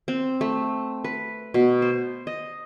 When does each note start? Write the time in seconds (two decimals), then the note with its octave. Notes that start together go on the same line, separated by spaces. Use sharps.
0.08 C4
0.41 A3
1.04 B4
1.54 B2
1.82 C5
2.27 D#5